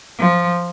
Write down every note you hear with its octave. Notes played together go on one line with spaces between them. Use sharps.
F3